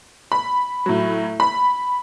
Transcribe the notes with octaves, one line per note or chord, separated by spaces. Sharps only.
B5
A2 F#3
B5